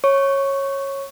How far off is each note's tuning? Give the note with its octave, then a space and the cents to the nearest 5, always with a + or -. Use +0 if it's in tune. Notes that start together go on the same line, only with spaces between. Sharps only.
C#5 -15 C#6 +0